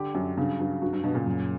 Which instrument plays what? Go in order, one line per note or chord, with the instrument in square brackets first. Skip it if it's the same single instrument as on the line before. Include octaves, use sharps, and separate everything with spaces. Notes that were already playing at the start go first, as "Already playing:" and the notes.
Already playing: [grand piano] D3 G4
[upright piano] F#2 [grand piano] F#3
[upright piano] G2 [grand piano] C#3
[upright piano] G2 [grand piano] F#3
[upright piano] G2 [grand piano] F#4
[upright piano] G2
[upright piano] G2 B2 [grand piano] F#3
[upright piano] A#2 C#3
[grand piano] F#2